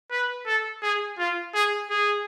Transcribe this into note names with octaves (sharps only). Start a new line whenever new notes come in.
B4
A4
G#4
F4
G#4
G#4